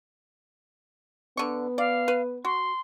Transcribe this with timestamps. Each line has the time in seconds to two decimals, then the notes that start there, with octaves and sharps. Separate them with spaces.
1.37 D3 B3 C#6
1.78 D5 F5
2.08 B4
2.45 F#4 C6